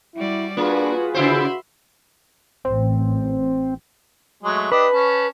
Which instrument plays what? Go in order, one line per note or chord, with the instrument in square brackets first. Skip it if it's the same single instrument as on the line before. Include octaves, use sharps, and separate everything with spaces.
[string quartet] G3 F#4 D5 [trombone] E4
[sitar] A#3 [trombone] D4 [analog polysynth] F4 G#4 B4 [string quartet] F#4
[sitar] C#3 E4 C5 [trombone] F#4 [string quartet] E5 B5 C6
[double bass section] A1 [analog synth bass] C4
[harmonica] F#3 G#3 A3
[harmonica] D4 G4 D#5 [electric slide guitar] B4
[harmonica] C#4 A5